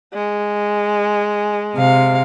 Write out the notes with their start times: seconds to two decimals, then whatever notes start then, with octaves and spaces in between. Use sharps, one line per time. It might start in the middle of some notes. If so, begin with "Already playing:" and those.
0.14 G#3
1.75 C3 F5